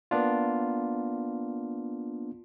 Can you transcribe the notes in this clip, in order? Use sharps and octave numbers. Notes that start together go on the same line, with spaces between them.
A#3 B3 D4 F4